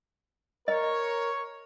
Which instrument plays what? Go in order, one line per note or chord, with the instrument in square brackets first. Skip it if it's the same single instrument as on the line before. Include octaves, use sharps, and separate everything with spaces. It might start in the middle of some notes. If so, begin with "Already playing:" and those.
[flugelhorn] A#4 [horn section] C#5 [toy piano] D#5